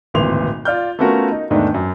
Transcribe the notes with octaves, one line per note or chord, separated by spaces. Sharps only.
D1 G#1 A#2 E3 C6 F7
F4 D5 F6 G6
A3 B3 C#4 F4 F#4 A#4
D#4
E2 G#2 D#3 A3 D4
F#2